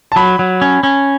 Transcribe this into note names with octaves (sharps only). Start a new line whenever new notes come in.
A5
F#3 B5
F#3
C#4
C#4